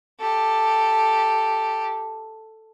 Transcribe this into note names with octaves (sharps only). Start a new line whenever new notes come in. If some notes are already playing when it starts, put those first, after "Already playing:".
G4 A4